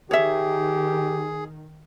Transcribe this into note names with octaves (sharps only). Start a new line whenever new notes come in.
D#3 G4 G#4 C#5 E5